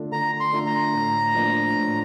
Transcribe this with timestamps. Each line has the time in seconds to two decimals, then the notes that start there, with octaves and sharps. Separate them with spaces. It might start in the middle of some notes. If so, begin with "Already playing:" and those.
Already playing: D3 A3 D4 F4
0.12 D3 A#5
0.40 C6
0.52 A3 D4 F4
0.66 A#5
0.94 A2
1.35 F3 A#3 D4 F4
1.76 A2